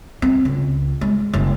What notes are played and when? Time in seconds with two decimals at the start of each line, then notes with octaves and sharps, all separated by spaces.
0.22 C4
0.45 C#2
1.01 G#3
1.33 F#1